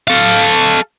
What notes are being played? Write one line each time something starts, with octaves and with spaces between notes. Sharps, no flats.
A4 F5